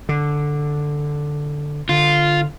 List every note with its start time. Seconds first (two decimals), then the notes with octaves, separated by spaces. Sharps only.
0.09 D3
1.89 D3 F4